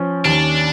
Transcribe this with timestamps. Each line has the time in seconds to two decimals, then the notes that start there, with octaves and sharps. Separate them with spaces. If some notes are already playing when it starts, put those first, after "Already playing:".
Already playing: F3 C#4
0.25 D#2 D4